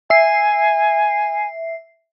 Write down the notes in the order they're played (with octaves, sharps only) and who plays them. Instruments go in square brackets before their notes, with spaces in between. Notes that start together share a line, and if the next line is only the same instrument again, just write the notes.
[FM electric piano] E5 C7 [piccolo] G#5